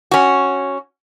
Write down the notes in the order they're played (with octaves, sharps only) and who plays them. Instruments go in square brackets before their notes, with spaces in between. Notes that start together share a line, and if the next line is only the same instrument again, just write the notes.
[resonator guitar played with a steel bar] C#4 F#4